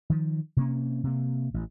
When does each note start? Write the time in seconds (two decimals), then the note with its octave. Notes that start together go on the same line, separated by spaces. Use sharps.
0.10 D#3 F3
0.57 C3 A#3 C#4
1.04 C3 A#3
1.54 A1